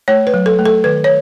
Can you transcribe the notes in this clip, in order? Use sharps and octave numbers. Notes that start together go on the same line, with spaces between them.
A3 C#5
B4
F#3
A4
A3
A4
D#3 B4
C#5